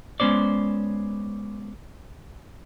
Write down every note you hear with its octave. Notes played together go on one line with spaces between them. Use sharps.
G#3 B3 C#4 C5 D5